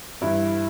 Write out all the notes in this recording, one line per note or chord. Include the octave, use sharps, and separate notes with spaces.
G2 E3 E4